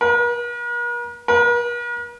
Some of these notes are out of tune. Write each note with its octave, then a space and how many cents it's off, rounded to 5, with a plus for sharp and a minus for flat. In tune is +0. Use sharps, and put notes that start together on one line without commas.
A#4 +45
A#4 +45